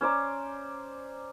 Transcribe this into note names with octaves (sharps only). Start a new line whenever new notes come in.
C#4 C5 D5 A#5